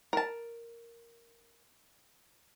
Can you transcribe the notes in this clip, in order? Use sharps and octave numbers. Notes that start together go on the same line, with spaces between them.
A#4 A5